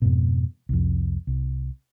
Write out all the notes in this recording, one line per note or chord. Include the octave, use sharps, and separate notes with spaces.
F2 G#2 B2
C2 F2
C2